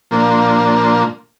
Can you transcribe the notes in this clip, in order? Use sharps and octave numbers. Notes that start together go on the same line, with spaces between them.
A#2 F3 A#3 D4